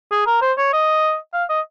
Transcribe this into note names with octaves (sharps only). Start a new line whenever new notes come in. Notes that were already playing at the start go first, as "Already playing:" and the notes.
G#4
A#4
C5
C#5
D#5
F5
D#5